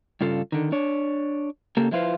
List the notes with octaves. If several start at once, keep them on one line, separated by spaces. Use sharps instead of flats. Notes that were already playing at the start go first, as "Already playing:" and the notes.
G2 C#3 F4 A4
D3 D#3
D4 C#5
C#3 A#3 G4 A4
F3 G#3 E4 F4 B4 C5